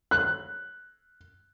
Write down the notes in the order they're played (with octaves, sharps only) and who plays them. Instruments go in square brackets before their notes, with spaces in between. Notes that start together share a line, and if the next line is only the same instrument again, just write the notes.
[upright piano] F#6